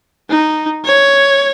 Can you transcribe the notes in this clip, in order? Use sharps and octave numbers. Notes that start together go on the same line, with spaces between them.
D#4
C#5